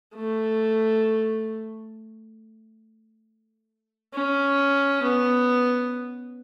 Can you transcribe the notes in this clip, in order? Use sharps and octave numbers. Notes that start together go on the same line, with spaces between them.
A3
C#4
B3